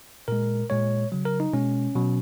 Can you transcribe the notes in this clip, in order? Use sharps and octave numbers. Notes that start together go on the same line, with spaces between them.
A#2 G#3 A#4
A#2 G#3 C#5
C#3 F#3
A#4
D#4
B2 G#3 C#4
B2 F#3